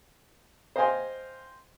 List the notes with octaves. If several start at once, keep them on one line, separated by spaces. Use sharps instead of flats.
C5 D#5 F5 G5 G#5 C6